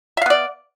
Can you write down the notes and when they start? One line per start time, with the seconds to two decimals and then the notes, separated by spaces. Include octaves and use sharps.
0.17 E5
0.22 F5
0.26 B3
0.30 D5